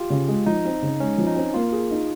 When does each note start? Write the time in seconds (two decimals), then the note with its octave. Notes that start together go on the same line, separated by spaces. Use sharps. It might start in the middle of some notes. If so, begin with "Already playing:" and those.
Already playing: F4 G4
0.10 C#3
0.28 G#3
0.46 F3 D#4
0.65 C4
0.82 C#3
1.00 G#3 C#4
1.18 F3
1.27 D#4
1.36 C4
1.54 A#3 F4
1.72 G#4
1.91 D#4